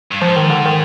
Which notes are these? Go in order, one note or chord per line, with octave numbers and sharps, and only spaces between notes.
G2
G#2 F3
D#3
D3
D#3